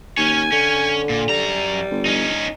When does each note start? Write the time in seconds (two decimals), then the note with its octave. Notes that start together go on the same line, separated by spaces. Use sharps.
0.18 D#2 C#4 C#5 G#5
0.52 D3 C#4
1.09 A#2
1.29 F#2 G3 A#5
1.91 G1
2.06 C#4 D#4